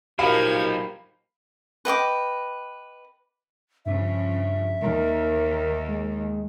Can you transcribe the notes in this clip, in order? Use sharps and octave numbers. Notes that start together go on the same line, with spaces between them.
F3 F#3 A#3 D#4 G4 F5 B5 G#6
B4 D#5 G5 D6
G2 C#3 F3 E5
D#2 A#4
G#3